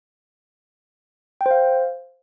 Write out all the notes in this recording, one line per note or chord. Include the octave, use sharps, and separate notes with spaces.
G5
C5
F5